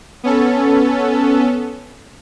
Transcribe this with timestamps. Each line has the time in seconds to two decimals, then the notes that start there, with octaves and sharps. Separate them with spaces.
0.23 B3 C#4 A4